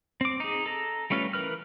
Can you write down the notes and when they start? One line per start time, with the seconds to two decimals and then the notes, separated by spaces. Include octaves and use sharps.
0.21 C4 D6
0.40 D#4 G#4
0.66 A4 A#5
1.10 G3 A3 C#4 F4 B4
1.33 E3 A#4 B4 F6